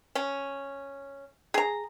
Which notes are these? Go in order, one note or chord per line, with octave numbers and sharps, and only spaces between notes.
C#4
G#4 A#5